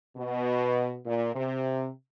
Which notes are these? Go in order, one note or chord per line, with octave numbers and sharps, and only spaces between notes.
B2
A#2
C3